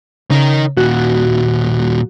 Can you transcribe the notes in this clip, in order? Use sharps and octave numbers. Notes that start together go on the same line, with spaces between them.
C#3 D#4 A#4
D#2 A#2 F#4